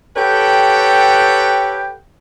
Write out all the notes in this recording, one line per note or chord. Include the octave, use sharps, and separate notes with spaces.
G4 A4 B4 C#5 F#5 G5